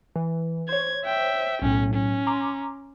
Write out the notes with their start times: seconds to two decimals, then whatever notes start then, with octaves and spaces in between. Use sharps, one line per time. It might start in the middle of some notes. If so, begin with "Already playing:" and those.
0.16 E3
0.69 C5 C#5 G#6
1.05 E5 G5
1.62 B1 A2 C#4
1.94 C#4
2.27 A#5 C6 D6